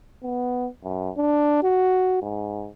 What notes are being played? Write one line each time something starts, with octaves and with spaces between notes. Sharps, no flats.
B3
F#2
D4
F#4
G#2